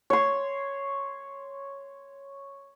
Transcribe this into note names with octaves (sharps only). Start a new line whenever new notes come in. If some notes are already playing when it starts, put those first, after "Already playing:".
C#5 C6